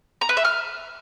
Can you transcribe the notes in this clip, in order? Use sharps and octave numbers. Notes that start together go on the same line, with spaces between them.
A#5
B4
E5
F6